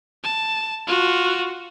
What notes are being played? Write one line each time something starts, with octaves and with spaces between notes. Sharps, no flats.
A5
F4 F#4